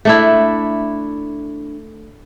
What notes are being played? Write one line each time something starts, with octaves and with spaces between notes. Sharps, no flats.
A3 D4 E4